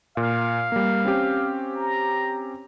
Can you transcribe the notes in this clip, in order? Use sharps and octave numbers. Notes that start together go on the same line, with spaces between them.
A#2 F5
G3 A#3
C4 C#4 G4
A#5